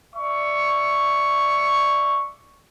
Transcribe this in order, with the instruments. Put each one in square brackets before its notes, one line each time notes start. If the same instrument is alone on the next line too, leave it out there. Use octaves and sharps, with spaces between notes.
[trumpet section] D5 E5 C#6